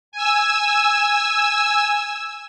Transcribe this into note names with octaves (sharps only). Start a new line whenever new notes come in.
G#5 E6